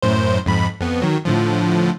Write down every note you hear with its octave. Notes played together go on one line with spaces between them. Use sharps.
F#2 A2 C5
F2 G#2 B5
F2 B3
D#3 F#3
A2 D3 F3